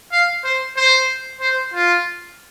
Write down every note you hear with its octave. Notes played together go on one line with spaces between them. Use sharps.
F5
C5
C5
C5
F4